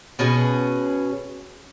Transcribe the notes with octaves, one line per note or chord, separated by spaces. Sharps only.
B2 C#4 G#4 B4